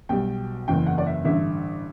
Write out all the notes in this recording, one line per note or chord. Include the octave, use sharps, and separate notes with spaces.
B1 B2 G3 G5
F#1 E2 C#3 G5
F#5
D5
E5
A1 G2 D3 E5